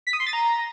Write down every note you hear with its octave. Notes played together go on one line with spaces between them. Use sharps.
B6
D#6
C6
A6
A#5